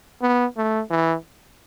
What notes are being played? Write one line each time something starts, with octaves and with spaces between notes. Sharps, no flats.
B3
A3
E3